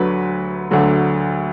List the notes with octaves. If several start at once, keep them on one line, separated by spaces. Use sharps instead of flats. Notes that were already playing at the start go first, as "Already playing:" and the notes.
Already playing: D2 D3 F#3 B4
D2 D3 F#3